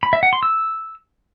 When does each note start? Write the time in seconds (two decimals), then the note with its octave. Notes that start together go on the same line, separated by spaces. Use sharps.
0.03 B5
0.13 E5
0.23 F#5
0.33 C6
0.43 E6